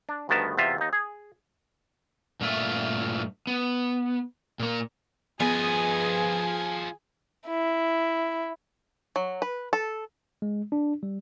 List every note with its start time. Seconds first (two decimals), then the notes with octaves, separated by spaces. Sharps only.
0.09 D4
0.29 D2 G2 D#3 B3 A#4 A5
0.57 E2 C3 F4 E5
0.78 D#2 D#4
0.93 G#4
2.41 G2 A#2 A3 F4 E5
3.47 B3
4.60 A#2 A#3
5.40 F3 B3 G#4 D#5 G#5
7.47 E4
9.16 F#3
9.42 B4
9.73 A4
10.42 G#3
10.72 D4
11.03 G3